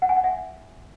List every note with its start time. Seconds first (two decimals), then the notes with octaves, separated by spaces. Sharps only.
0.02 F#5
0.09 G#5
0.16 F#5
0.24 E5